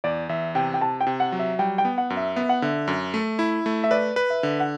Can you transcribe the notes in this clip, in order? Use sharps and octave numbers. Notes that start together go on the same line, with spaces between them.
E2 D5
E2 E5
C3 G5
G5
C3 A5
G5
C3
F#5
F#3
E5
G3 G5
G5
B3
F#5
F#2
E5
B3 E5
F#5
D3 E5
F#2
A3
E4
A3
E5
B4 D5
B4
E5
D3
F#5